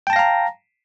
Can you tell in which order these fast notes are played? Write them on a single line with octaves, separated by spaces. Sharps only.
G5 A5 A#6 F5 A#5